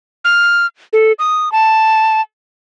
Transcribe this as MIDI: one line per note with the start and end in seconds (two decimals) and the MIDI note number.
0.25 0.66 89
0.93 1.12 69
1.19 1.51 87
1.52 2.21 81